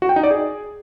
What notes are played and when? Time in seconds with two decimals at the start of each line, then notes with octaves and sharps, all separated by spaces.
0.02 F#4
0.09 G5
0.16 D#4
0.23 D5
0.31 G#4